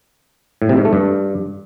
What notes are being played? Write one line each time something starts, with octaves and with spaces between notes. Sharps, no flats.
A2
C3
G#2
A3
G2